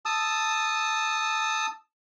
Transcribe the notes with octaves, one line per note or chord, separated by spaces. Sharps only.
A5 D#6 E6